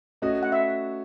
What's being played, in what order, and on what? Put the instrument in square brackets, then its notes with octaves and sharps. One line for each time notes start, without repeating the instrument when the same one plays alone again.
[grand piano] A3 C#4 F#4 [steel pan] D#5
[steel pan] F#5
E5